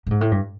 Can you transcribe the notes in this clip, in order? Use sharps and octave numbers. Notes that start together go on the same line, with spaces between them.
A2
G#2
A2
G2